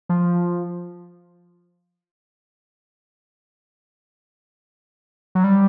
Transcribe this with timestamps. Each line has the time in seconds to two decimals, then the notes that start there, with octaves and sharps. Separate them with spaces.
0.09 F3
5.35 F#3
5.44 G3